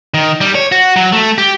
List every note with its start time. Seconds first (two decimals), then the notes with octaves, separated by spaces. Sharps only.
0.14 D#3
0.41 G3
0.55 C#5
0.72 F#4
0.96 F#3
1.12 A3
1.38 G4